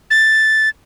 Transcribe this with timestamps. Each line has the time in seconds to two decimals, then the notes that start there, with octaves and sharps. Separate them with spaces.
0.11 A6